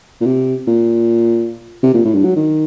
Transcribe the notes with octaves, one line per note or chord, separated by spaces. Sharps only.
A#2
C3
A#2
C3
A#2
A2
G2
F#3
D#3